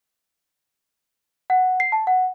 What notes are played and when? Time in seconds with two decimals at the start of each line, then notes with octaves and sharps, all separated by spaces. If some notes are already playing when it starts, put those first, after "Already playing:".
1.50 F#5
1.80 C7
1.92 A5
2.07 F#5